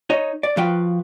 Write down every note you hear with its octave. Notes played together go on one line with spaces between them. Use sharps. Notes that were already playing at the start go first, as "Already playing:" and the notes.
D#4 C#5 D#5
D5
F3 F#4 B4 F5 G5